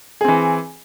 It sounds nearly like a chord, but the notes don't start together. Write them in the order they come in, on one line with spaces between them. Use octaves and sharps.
G#4 C4 E3